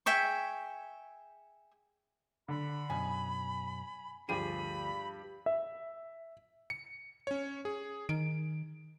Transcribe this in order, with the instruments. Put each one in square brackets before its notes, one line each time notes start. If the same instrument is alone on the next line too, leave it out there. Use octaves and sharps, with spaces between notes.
[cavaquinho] G#4 E5 G5 C#6
[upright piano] D3 [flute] B5
[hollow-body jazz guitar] F#2 B2 [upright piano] G#5
[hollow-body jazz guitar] D2 F3 G#4 [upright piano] G2 G4 D#7 [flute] B5
[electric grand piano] E5
C#7
C#4 C#5
G#4
[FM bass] D#3 [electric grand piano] D7